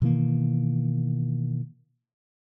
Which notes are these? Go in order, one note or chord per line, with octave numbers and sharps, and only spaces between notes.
B2 D#3 E3 A#3